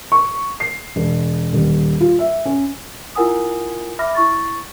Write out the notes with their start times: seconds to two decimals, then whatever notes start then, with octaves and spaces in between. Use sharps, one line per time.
0.12 C#6
0.60 C7
0.96 E1
1.53 D#1
2.01 F4
2.19 E5
2.45 C#4
3.16 E4 F4 A#4 F#5 G#5 D#6
3.99 E5 B5 D6 F6 A#6
4.15 E4 C#6 A6